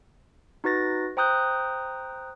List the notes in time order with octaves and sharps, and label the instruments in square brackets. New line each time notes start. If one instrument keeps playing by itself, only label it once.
[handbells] D#4 F#4 B4 A6 A#6
C5 G5 A#5 D#6 F#6 G6